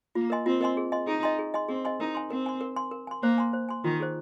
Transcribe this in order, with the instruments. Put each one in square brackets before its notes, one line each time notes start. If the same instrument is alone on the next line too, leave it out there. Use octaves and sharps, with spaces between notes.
[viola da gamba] A#3 [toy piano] F4
[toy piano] A#4 D#5 G#5 C6
[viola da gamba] C4 [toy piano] F4
[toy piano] A#4 D#5 G#5 C6
G#4
D#5 G#5 C6
[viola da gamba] D#4 [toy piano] G#4
[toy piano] D#5 G#5 C6
G#4
D#5 G#5 C6
[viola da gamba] C4 [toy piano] G#4
[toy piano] D#5 G#5 C6
[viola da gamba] D#4 [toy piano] A#4
[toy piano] G#5 C6
[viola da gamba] C4 [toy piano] A#4
[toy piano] G#5 C6
A#4
G#5 C6
A#4
G#5 C6
[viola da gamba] A#3 [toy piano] C5
[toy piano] G#5 C6
C5
G#5 C6
[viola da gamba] D#3 [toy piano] F4
[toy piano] G#4 C5